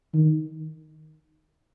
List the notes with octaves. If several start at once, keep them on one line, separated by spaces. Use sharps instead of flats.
D#3